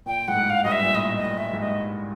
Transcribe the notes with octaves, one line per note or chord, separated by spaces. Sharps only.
A#2 G5
G#2 F#5
A2
F5
G2 D#5
E5
A#2
A2 D#5
D#5
A2
E5
G#2
D#5